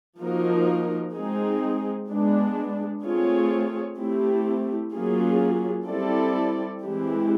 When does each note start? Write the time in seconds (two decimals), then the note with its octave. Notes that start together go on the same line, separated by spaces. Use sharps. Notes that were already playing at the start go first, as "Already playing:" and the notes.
0.20 F3 A#3 D#4 F#4 A#4
1.14 G#3 C4 D#4 G#4
2.09 G#3 B3 D4
3.03 A3 C4 F4 G#4 C#5
3.98 A3 C4 E4 G4
4.93 F#3 A#3 C#4 F4 G#4
5.87 G3 C4 E4 A4 D5
6.82 E3 G#3 C4 E4 G4